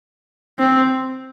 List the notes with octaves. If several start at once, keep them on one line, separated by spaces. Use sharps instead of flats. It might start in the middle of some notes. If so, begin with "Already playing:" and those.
C4